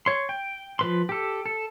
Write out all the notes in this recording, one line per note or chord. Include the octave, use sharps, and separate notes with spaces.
C#5 C6
G5
F3 B4 C6
G4 A4
A4